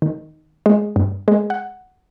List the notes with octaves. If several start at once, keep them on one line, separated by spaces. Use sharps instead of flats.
D#3
G#3
G2
G#3
F#5